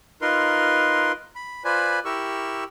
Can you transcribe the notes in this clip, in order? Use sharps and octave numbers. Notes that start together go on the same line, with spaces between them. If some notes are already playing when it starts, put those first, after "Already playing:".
D#4 F4 A#4 B4 C6
B5
F4 B4 C5 D5 G#5 B5
E4 G4 A#4 C#6 E6